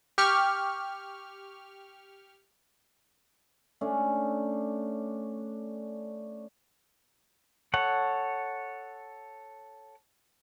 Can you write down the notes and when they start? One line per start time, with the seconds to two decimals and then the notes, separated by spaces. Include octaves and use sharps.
0.18 G4 C#6 F6
3.81 A3 C#4 D4
7.74 A4 C#5 F#5